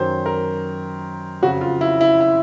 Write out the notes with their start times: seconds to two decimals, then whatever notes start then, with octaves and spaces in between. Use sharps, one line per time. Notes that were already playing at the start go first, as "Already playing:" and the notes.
Already playing: F#2 D#3 F#3 C5
0.26 A#4
1.42 F2 C#3 F#3 F#4
1.61 F4
1.81 E4
2.01 E4
2.21 E4